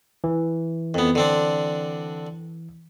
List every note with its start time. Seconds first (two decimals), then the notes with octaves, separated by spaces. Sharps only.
0.24 E3
0.94 F2 B3
1.15 D3 C4 D4